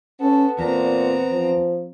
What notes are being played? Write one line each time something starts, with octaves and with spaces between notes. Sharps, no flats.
B3 C#4 A4
E2 A#2 C4 A#5
F3